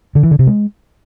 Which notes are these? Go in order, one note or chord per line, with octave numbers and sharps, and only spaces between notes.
D3
E3
D3
C3
G#3